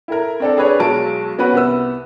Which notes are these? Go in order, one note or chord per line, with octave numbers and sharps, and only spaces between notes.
E4 A4 A#4
C4 D4 A4
D4 G#4 B4 C#5
B1 F#3 G#3 A5 D7
B3 C#4 F#4 B4
C2 B3 E6